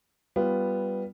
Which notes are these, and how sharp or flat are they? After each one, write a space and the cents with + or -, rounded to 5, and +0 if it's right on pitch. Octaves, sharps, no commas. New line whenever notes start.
G3 +0 B3 +0 F4 +0